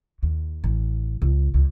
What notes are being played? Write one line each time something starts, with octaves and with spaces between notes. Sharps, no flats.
D#2
A1
C#2
C#2